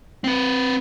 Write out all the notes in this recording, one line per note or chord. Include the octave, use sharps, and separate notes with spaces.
C4 B4